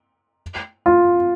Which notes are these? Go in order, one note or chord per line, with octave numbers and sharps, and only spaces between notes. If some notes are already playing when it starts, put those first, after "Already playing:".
F4